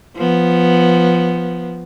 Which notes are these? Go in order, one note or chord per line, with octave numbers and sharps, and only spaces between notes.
F3 B3